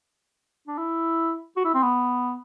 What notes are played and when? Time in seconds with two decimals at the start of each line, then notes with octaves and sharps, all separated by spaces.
0.67 D4
0.78 E4
1.57 F#4
1.65 E4
1.74 C4
1.83 B3